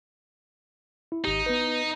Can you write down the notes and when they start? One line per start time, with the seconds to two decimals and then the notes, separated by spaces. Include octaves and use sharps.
1.12 E4
1.25 G#1 D#4 G4
1.46 B3 B4